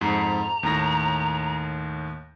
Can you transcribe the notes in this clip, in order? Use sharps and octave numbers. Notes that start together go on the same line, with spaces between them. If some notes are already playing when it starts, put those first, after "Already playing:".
F2 G#2 A#5
D#2 A2 A#6